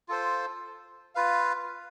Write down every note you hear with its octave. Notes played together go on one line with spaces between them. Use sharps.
F4 A4 C5
F4 B4 F5